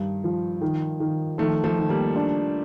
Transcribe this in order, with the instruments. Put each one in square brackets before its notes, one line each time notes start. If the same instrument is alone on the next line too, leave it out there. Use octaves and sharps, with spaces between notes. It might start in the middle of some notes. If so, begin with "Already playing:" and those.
Already playing: [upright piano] G2 [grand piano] D#3
[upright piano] F3
D#3
D#3
[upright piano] D#3 [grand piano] F3 A3
[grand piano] F3 A3
[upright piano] D#3
[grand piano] G3 A#3
[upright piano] D4